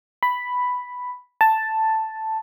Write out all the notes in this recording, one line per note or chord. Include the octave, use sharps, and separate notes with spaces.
B5
A5